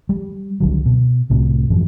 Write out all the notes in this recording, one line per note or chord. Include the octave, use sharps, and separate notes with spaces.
G3
C#2 D3 F#3
B2
C2 A2 C3
F#2 A2 E3 F3